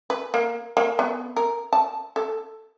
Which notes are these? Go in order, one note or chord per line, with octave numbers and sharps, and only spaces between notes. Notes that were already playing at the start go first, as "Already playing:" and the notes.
B4
A#3
A#3
B3
A#4
A5
A4